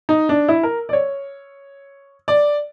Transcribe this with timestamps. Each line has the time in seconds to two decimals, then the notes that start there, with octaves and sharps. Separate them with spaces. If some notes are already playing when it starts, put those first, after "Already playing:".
0.09 D#4
0.29 D4
0.49 E4
0.63 A#4
0.89 D5
0.93 C#5
2.28 D5